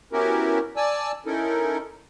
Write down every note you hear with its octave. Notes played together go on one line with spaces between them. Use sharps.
B3 C#4 E4 F#4 G4 A#4
D5 G#5 A5 E6
C#4 D#4 E4 A4 A#4